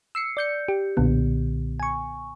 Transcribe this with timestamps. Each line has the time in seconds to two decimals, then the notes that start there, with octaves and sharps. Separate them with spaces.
0.15 E6 C7 C#7
0.37 D5 G6 C#7
0.68 G4
0.97 B1 A#2 D3 B3
1.80 G#5 C#6